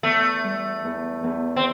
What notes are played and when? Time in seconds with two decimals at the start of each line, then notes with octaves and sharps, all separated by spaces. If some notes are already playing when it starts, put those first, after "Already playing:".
0.03 E2 A3
0.44 G3
0.85 E2
1.24 E2
1.56 C4